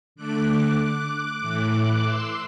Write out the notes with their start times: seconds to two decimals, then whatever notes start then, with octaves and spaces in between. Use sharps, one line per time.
0.15 D3 A3 D6 F#6
0.78 D6 F#6
1.41 A2 E3 A3
2.03 C6 E6